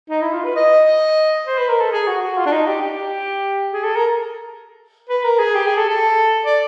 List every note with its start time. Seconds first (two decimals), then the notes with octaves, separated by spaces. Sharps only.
0.10 D#4
0.22 E4
0.33 F4
0.44 B4
0.56 D#5
1.47 C5
1.58 B4
1.69 A#4
1.81 A4
1.92 G#4
2.07 F#4
2.22 F#4
2.38 F4
2.46 D4
2.52 D#4
2.67 G4
2.82 G4
3.73 G#4
3.84 A4
3.96 A#4
5.09 B4
5.24 A#4
5.39 G#4
5.55 G4
5.66 G#4
5.78 A4
5.88 A4
6.46 D5